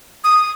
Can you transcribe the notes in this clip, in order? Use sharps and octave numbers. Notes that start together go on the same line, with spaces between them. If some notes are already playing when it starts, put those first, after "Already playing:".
D#6